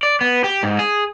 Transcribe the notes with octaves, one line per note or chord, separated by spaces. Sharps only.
D5
B3
G4
G#2
G#4